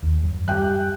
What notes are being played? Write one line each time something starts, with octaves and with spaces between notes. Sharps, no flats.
D#2
F#2
G3 G4 G5 F#6